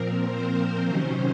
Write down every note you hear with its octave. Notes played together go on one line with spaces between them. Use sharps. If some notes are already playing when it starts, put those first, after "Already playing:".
Already playing: A#2 F3 C4 A#4
C5
C3 D#3 F#3 C#4